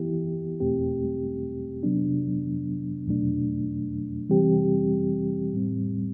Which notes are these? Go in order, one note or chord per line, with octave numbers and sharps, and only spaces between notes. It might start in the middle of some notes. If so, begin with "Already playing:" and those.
Already playing: E3 B3 E4 G4
E2 B2 A3 C4 G4
C3 F#3 B3 D4
E2 B2 F#3 A3 D4
C3 E3 G3 C4 G4
A2 G3 C4